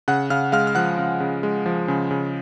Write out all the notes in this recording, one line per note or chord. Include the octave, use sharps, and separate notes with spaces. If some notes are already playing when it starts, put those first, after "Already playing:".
C#3 F#5 F#6
C#3 F5 F6
G#3 F5 F6
F6
F3 F#5 F#6
C#3
C#3
G#3
F3
C#3
C#3